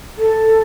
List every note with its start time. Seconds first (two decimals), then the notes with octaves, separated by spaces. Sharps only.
0.18 A4